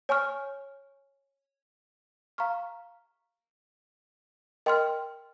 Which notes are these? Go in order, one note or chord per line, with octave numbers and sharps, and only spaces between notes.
C#5 G#5 C#6 F6
F5 A#5 C#6 F6
A#4 D#5 G5 C6 F6